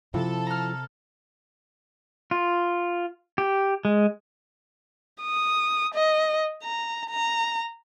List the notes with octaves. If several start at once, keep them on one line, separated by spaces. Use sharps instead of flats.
C3 F3 E4 F4 A4
A#5 F6
F4
G4
G#3
D#6
D#5
A#5
A#5